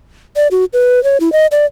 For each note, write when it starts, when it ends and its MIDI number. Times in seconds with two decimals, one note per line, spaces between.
0.36 0.48 74
0.51 0.65 66
0.73 1.03 71
1.04 1.17 73
1.20 1.32 64
1.32 1.46 75
1.52 1.66 74